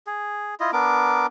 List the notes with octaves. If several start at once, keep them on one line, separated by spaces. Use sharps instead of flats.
G#4
E4 F4 D#5
B3 D4 A#4 D6